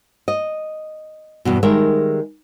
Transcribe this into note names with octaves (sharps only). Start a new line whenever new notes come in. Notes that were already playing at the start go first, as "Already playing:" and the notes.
D#5
E2 G2 B2
D#3 G3 G#3 A#4 E5